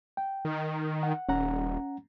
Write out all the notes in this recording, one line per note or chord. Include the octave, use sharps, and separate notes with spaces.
G5
D#3
F#5
D#1 C#4 F#5 A#5